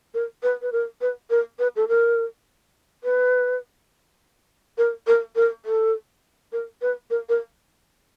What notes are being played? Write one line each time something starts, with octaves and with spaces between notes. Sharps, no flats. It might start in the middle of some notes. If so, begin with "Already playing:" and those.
A#4
B4
B4
A#4
B4
A#4
B4
A4
A#4
B4
A#4
A#4
A#4
A4
A#4
B4
A#4
A#4